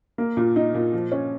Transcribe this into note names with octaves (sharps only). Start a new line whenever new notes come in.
A#3
A#2
D#4
A#2
F3
C#4